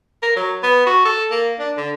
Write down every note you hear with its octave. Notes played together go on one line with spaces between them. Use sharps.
A#4
F#3
B3
F#4
A4
A#3
D4
D3